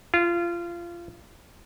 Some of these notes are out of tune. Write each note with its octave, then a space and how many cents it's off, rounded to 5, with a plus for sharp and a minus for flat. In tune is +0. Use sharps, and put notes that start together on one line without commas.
F4 -25